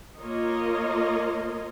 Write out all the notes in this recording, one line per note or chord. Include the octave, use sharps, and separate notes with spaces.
A#3 F4 A#4 C#5 D#5